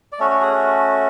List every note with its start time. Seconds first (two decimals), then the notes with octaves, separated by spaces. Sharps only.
0.12 D5
0.19 A3 C#4 F#4 C#5
0.30 C#5
0.42 G#4
0.53 F#4